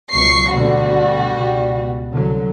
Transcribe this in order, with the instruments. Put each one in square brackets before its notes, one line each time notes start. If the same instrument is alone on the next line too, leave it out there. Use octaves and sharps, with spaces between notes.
[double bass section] C#2 B2 F#3 [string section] C#6 C7
[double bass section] D2 B2 D3 [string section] G3 F#4
[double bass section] C#2 B2
C2 D3 F#3